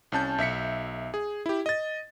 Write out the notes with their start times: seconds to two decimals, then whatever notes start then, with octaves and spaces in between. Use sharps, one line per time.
0.12 C2 C#4 A5 G6
0.38 B1 E5 B6 C#7
1.14 G#4
1.46 E4 G4
1.66 D#5 A6